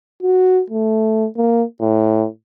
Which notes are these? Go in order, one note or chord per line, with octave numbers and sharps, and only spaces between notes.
F#4
A3
A#3
A2